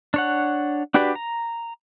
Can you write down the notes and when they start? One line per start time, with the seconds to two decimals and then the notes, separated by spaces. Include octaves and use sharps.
0.14 D4 C#5 F#5
0.94 D4 F#4 G4 B4 D5
1.15 A#5